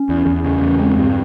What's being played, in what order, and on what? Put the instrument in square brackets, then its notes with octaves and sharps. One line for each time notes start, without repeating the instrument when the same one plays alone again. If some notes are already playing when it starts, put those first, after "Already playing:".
Already playing: [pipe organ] C#4
[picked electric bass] E2
E2
[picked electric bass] C#3 [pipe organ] C#4
[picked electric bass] E2
[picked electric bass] G#3 [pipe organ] C4
[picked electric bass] G2